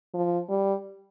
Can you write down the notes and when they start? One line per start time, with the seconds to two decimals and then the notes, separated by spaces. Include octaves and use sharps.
0.14 F3
0.49 G3